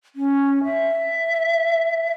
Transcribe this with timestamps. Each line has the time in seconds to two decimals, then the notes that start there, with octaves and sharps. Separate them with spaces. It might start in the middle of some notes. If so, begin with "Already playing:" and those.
0.16 C#4
0.64 E5